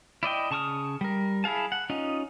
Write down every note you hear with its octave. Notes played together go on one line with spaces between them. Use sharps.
E4 D5 D#5 G5
C#3 A5 C#6 D#6 F6
G3 A#4
E4 G#4 F5 A5
F#5
C#4 D#4 F4 D#5